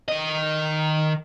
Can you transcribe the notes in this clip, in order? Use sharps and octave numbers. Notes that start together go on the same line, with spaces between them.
D#3 D#5